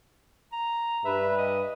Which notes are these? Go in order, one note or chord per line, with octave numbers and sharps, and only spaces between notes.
A#5
G2 B4 E5
D#5